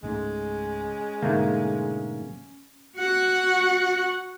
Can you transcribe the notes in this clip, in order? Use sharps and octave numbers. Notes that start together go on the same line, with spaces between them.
C#2 G#2 G#3 A3 C#4
G#2 B2 D3 A3 A#3
F#4 F#5